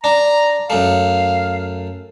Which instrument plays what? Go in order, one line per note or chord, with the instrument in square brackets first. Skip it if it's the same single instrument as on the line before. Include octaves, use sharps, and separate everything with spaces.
[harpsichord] D4 [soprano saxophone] A#5
[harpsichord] F#2 A3 [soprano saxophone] F5